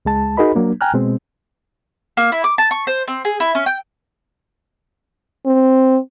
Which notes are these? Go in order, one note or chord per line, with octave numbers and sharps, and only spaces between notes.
C#2 G#3 A5
D#4 F#4 G#4 A#4 D#5 B5
F#3 A#3 D4
G5 G#5 A#5 F6 F#6
B2 G#3 C4
A#3
E4
D6
A5
C#6
C5
C4
G#4
E4
C#4
G5
C4